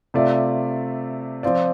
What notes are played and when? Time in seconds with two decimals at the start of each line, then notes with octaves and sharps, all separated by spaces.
0.14 C3 A3 F4 D5
1.43 F3 C4 F4 D5